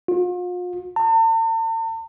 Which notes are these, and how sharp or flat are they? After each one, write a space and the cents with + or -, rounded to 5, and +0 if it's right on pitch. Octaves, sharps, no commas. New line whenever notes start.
F4 +40
A5 +45